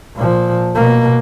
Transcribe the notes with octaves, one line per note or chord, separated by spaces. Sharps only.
A#2 F3
B2 A#3